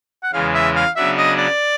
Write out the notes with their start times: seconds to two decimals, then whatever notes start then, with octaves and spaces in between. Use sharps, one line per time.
0.23 F#5
0.33 E2 C#3 E3 G#3 F5
0.54 E5
0.76 F5
0.96 C#3 F#3 B3 D4 F#4 E5
1.18 D#5
1.38 D5